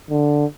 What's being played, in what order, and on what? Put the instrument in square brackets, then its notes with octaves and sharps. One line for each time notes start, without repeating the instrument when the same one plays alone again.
[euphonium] D3